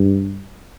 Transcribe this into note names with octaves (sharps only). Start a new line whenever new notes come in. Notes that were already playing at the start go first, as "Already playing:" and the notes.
Already playing: G2